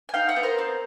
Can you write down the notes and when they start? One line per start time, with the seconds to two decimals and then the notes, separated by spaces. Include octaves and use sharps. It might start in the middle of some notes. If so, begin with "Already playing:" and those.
0.09 G#5
0.14 D#4 F5 G5
0.29 E5 F#5
0.36 B3
0.43 A#4 C5
0.58 C4